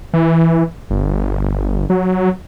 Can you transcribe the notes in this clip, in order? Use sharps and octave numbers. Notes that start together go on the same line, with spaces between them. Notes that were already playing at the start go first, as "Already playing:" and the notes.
E3
G1
F#3